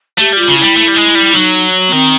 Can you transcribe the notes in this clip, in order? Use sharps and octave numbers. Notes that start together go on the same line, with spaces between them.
A3 G4
G3 F4
C#3
G3 E4
A3
G3
G#3
G3
F#3 D#4
B3
D#3 C4